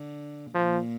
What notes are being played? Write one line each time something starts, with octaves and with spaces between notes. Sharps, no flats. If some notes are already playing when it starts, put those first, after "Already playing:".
Already playing: D3
A#2 F3